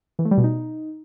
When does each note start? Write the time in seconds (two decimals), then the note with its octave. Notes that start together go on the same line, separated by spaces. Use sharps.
0.19 E3
0.25 A3
0.31 G3
0.37 B2
0.44 D#4